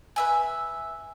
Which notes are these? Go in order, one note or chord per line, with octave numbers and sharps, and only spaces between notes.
B4 E5 G#5